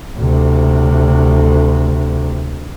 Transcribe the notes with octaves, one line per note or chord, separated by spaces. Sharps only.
D2 C3